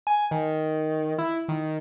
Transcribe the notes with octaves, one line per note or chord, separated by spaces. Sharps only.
G#5
D#3
E4
D#3